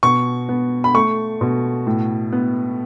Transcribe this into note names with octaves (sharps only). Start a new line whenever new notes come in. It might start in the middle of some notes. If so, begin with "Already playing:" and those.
B2 C#6
B3
B5
A3 C#6
B2
A2
B3